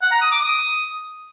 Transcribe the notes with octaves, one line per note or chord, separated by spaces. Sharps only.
F#5
A#5
D#6
D6
D#6